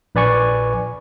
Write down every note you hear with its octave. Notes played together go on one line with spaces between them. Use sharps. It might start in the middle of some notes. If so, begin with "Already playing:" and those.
A#1 B4 D5 G#5 C#6